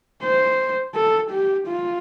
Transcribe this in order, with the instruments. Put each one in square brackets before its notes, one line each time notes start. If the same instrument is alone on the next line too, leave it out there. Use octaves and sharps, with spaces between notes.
[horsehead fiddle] C5
A4
G4
F4